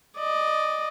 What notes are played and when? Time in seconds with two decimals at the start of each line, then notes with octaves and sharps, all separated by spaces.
0.18 D5 D#5